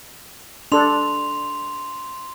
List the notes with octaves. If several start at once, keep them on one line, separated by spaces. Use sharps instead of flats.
D4 A4 C6 F7